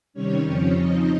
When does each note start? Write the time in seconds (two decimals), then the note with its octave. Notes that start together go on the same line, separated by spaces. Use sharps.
0.14 C3 D#3 G3 C#4 C#5
0.44 F2 C#3 F3 C4 C#4 C#5
0.75 C#3 F3 C4 D#4 D#5